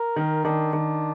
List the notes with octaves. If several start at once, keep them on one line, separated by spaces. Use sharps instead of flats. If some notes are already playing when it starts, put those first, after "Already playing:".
Already playing: A#4
D#3
D#3 D4
D#3